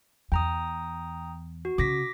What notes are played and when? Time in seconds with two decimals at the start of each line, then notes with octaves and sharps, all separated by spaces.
0.32 E2 G5 A#5 D#6
1.65 F#4
1.78 C#3 D6 A#6 B6